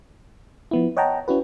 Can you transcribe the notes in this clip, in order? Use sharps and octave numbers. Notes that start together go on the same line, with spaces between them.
F3 B3 E4
C#5 D#5 F#5 G5 A5 A#5
C#4 E4 F#4 B4